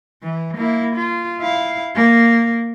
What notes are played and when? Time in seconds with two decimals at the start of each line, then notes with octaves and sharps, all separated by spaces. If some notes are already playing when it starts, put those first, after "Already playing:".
0.22 E3
0.57 A#3 E4
0.95 F4
1.40 E4 F5
1.95 A#3